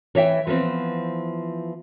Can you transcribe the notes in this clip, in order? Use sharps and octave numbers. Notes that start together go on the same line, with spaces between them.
E3 C#5 E5 G5
E3 F3 B3 C4